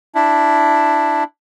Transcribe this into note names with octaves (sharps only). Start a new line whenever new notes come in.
D4 E4